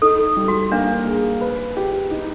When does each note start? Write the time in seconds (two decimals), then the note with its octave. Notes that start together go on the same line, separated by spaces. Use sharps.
0.02 D#4 A4
0.37 G3
0.48 F#4
0.72 A#3 D4
1.07 G#4
1.41 B4
1.77 G4
2.11 D#4